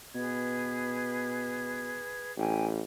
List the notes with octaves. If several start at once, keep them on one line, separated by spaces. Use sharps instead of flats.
B2 G#4 B4 G#6
A1 G5 G#5